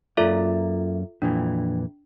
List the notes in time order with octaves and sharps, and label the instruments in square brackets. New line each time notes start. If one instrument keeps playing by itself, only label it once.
[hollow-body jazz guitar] F#2 A#3 D5 [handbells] F4 A4 E5
[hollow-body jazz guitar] F2 A#2 E3 [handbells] D4